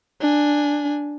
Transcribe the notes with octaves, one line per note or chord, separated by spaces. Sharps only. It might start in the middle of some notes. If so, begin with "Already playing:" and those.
D4 G#5